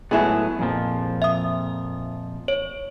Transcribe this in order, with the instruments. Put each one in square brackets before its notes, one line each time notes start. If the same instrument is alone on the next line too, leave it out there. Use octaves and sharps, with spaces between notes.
[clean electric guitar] A2 F#3 B3 [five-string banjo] G#3 E4 G#4
[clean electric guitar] F2 A#2 F3
[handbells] E5 D#6
C#5